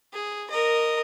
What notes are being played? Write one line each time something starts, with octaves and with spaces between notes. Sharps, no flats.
G#4
A#4 D#5